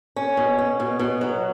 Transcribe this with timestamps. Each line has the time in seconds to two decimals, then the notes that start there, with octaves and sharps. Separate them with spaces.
0.16 C#4
0.37 B2
0.58 C#4
0.80 B2
0.99 B2
1.21 F#3